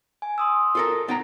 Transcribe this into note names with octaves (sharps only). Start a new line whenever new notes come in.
G#5
C6 D#6 E6
F4 A4 A#4
B3 D#4 G5 A#5